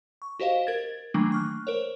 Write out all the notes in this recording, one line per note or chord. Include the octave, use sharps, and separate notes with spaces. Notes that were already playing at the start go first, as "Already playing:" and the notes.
C#6
F#4 G4 C5 D#5 F5
A#4 G#6 A6
D#3 E3 F#3 A3 A#3 D4
C#6 F6 F#6
A#4 C5 C#5